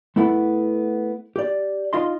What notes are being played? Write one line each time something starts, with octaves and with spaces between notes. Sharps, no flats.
A3 B3 E4 A4 F#5
G4 D5
D#4 F4 D#5 C6